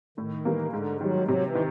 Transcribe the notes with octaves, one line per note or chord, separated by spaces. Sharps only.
A2 D#3
E3 G3 A#3
G#2 D3
D#3 F#3 G3
C3 F#3
E3
D#3